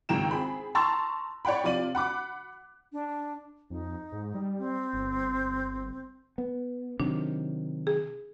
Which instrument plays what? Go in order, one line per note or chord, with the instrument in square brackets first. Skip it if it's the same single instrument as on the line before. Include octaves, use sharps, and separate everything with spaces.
[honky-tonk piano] G#1 C#2 D#3 G5 A#5 E7
C4 G#4 B5
A5 A#5 C6 C#6 E6 A6
C#5 D5 F#5 G5 B5
C3 F3 F4 D5 D#7 F#7
F#5 B5 D6 F#6
[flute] D4
[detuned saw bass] F2 [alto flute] D#4
[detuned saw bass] G#2
G3
[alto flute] C4
[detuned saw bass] G1
[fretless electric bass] B3
[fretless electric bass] C3 D#3 F#3 [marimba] D4
[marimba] G#4